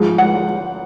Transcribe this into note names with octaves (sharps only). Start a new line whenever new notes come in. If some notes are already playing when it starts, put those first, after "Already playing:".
Already playing: G#2 F3 G#3
F#5